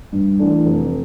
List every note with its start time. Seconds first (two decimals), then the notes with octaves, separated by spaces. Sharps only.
0.12 G2
0.39 E3 A3 D4
0.66 F1